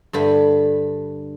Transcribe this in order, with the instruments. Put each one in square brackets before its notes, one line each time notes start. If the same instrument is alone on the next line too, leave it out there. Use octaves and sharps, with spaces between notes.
[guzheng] G2 D3 B5